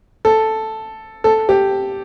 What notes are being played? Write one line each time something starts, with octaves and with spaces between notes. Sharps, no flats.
A4
A4
G4